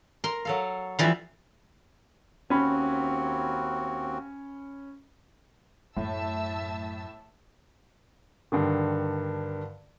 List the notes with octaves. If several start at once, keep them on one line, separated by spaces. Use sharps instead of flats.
A#4 C6
F#3 A4 F5
E3 F3 G3 E5 F5
D#2 C4 C#4 F#4 B5
F#2 A2 E5 A5 E6
G2 D3 D#3